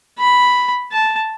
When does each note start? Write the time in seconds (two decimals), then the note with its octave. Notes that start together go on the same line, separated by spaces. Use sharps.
0.19 B5
0.92 A5